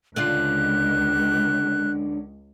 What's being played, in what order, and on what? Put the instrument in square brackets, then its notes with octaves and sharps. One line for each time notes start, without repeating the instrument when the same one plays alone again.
[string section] C#2 [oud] D3 D4 F4 [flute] F#6